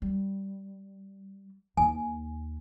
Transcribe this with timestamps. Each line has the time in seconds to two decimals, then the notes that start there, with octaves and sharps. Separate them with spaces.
0.02 G3
1.77 D#2 G#5